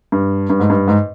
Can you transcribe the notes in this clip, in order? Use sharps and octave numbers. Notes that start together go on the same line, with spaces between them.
G2
G2
G#2
G2
G#2